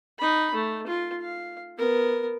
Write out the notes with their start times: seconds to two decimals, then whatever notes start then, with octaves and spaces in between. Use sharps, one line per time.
0.19 D#4 B5
0.54 A3
0.87 F4
1.21 F5
1.78 B3 A#4